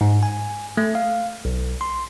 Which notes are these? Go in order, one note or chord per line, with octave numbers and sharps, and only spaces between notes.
G#2
G#5
A3
F5
B1
C6